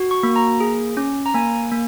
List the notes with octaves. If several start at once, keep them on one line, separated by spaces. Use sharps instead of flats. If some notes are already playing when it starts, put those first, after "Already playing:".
Already playing: F#4
C#6
A#3
A#5
G#4
C#4
A#5
A#3 G#5
A#3